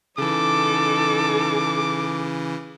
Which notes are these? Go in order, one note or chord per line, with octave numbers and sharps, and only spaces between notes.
C#3 E3 D#4 A4 D6